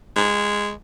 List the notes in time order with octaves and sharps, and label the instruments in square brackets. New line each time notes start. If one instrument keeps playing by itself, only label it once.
[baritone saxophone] G#3